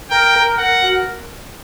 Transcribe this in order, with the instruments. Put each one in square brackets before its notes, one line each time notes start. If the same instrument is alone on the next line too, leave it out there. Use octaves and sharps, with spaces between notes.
[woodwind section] A#4 [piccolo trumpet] G5
[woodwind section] A#4
[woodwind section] A#4 [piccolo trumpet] F#5
[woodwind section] F#4